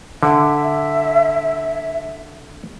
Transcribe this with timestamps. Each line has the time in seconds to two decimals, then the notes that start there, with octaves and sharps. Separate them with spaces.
0.23 D3 E5